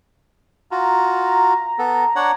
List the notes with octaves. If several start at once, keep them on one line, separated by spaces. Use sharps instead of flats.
F4 F#4 A#5
B3 A4
D4 C#5 F#5